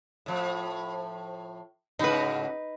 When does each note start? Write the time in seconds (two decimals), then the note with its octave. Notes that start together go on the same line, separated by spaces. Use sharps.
0.26 A2 F3
1.99 G#2 C#3 D#4 F#4 B4